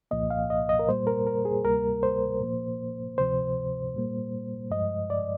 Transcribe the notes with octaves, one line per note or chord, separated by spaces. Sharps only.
C2 A#2 F3 A#3 D#5
F5
D#5
D#5
A#4
A#2 G3 A#3 C5
A#4
A#4
G#4
D2 C3 G3 A#3 A#4
C5
A#2 F3 A#3
D2 C3 F3 C5
A#2 G3 A#3
G2 F3 G#3 D#5
D5